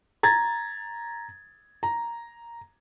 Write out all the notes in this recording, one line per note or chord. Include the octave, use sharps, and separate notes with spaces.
A#5 G#6 A6
A#5